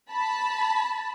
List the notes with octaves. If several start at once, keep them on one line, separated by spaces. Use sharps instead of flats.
A5 B5